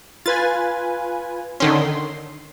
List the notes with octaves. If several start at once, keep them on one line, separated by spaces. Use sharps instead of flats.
F4 B4 G#5 A6
D3 D#3 C#4 C6